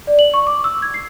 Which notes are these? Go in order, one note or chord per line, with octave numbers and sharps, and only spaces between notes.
D5
F#7
C#6
D6
E6
G#6
C7